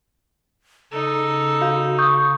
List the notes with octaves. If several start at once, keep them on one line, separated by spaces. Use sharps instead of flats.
C#3 D#4 A4
F#4 F5 G6
C#6 D#6 G6